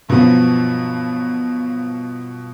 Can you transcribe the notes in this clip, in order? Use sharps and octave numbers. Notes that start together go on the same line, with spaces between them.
G2 B2 F3 F#3 B3